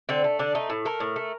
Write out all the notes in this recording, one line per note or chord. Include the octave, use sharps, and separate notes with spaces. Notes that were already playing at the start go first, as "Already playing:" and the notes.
D3 C4
A3
D3 D4
A3 D#4
A2
A3 A#4
A2
A3